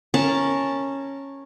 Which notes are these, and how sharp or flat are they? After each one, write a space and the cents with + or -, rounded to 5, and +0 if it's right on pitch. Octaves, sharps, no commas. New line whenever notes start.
C#4 -10 A#4 -5 A5 +0